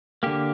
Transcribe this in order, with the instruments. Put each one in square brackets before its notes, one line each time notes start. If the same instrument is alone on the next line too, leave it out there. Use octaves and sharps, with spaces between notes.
[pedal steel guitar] D3 A#3 G4